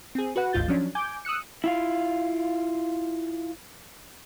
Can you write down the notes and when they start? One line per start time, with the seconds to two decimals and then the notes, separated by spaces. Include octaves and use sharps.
0.15 C4 G#4
0.36 F#4 B4 F#5
0.53 G1 D2 G#2 F4 G6 A6
0.68 F3 F#3 C#4 D4
0.95 G#5 D6 G6
1.25 D#6 E6 F#6 C#7
1.64 E4 F4 F5